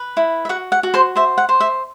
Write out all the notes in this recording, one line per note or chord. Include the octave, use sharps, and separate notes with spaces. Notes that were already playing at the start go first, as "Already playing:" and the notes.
Already playing: B4
E4
E5
F#4 F#5
F#5
F#4
C5 C6
C5 E5
F#5
C5
E5